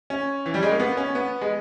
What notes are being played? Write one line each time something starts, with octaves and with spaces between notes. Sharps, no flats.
C#4
E3
G3
G#3
A#3
B3
C#4
B3
G#3